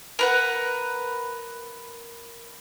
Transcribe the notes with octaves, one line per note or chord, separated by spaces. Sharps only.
A#4 B4 F#5